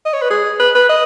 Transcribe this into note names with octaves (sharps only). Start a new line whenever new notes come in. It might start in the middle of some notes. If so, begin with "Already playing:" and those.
D#5
C#5
B4
G#4
B4
B4
D#5